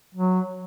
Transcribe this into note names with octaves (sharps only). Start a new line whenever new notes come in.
F#3